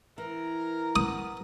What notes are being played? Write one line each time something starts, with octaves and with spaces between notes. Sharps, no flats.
E3 A#4
B3 D#6